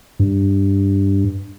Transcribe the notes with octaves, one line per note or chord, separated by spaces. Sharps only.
G2